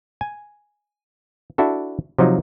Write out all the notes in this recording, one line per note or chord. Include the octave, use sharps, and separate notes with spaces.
G#5
D4 E4 F#4 A4
C3 F3 F#3 D#4